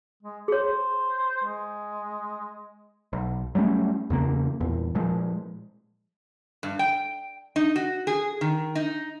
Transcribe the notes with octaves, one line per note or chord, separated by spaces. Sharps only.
G#3
G#4 C5 C#5
G#3
B1
F#3 G3 A3 C#4
E2 C#3 A#3
E2 A#2
A#2 F3 G#3
G2
G5
D#4
F#4
G#4
D#3
D#4